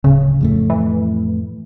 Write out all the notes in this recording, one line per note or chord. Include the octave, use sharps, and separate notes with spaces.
D1 C#3
F2 A2 A3
E3